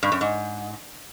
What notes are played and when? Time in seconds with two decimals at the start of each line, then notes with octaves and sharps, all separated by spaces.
0.03 G2
0.12 F#2
0.21 G#2